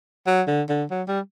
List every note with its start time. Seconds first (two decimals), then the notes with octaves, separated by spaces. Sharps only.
0.27 F#3
0.47 D3
0.69 D3
0.91 F#3
1.08 G3